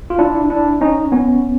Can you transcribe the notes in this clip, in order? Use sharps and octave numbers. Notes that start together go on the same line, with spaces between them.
F4
D4 E4
D4 E4
C#4 D#4
B3 C#4